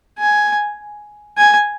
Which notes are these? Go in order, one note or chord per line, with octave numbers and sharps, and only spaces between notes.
G#5
G#5